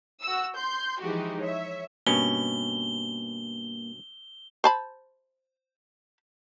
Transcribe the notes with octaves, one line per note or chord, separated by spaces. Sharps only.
F#4 E6
C6 G6
E3 F3 G#3 D#4 F#4 G4
C#5 E5
G2 B2 A#3 C#4 G7
C5 A5 B5